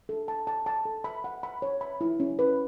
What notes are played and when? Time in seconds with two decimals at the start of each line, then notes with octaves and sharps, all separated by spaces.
0.09 A4
0.28 A5
0.47 A5
0.66 A5
0.85 A4
1.04 B5
1.24 F#5
1.43 B5
1.62 C#5
1.81 B5
2.01 E4
2.20 C#4
2.39 B4